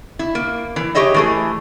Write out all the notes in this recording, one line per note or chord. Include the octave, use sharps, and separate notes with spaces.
E4
A#3
E3
G4 G#4 C#5 D#5 E5
E3 A3 G#4